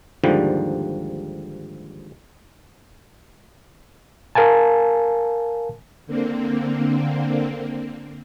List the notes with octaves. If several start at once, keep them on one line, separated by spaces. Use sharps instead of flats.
D#2 G#2 D3 F3 G3
A#4 F5 G#5 A5
D3 A#3 C4